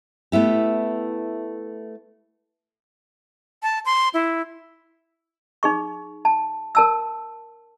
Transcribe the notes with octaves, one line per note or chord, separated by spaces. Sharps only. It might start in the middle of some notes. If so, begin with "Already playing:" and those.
A3 B3 E4 G4
A5
C6
E4
D#4 G#4 C#6
A5
A#4 A5 E6